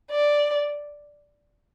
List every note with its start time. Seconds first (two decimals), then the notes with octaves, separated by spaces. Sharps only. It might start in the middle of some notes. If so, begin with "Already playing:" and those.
0.11 D5